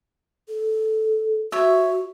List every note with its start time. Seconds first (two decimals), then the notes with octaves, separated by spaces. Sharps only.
0.48 A4
1.52 F#4 C#5 E5